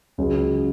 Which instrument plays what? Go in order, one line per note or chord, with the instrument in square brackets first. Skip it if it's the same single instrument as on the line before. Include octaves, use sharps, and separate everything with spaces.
[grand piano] C#2 C#3 F#3 C#4 G#4